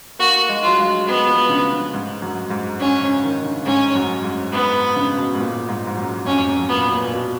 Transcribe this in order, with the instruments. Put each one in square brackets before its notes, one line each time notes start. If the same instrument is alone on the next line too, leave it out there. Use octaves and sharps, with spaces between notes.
[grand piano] A#3 [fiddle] F#4
[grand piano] G#3
[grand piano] F#3 [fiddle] F4
[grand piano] G#3
[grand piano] G#3 [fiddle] B3
[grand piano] F3
C#3
C#3
G#2
F#2
G#2
[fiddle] C#4
[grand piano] C#3
D#3
C#3
[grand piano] G#2 [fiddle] C#4
[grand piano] F#2
G#2
[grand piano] G#2 [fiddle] B3
[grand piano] C#3
B2
G#2
A#2
G#2
G#2
F#2
[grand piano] F2 [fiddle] C#4
[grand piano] F#2
[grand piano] A#2 [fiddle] B3
[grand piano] A#2
A#2
B2